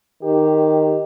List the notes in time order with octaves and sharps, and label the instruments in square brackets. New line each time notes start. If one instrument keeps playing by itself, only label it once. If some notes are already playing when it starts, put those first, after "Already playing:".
[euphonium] D#3 [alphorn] G4